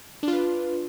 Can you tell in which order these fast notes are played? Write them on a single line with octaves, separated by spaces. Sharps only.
D4 F4 B4